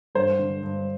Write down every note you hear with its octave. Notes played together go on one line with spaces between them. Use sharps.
G2 C5
D3
G2